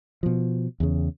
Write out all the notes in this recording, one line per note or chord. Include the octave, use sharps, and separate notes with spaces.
B2 F3
E2 C#3